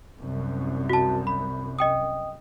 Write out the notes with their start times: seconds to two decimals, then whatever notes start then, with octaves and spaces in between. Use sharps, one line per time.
0.18 C2 F#2
0.90 F#4 A5
1.27 B5
1.79 D#5 G5 D#6